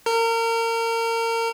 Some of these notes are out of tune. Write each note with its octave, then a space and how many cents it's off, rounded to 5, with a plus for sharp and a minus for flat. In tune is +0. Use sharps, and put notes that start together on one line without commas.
A#4 -30